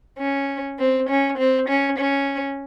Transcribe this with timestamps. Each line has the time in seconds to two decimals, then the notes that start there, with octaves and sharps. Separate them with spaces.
0.18 C#4
0.78 C4
1.08 C#4
1.37 C4
1.68 C#4
1.98 C#4